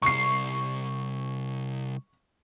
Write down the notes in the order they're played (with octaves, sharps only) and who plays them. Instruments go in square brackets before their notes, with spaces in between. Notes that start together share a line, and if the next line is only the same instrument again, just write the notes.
[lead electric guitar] C2 [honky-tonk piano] C#6 C7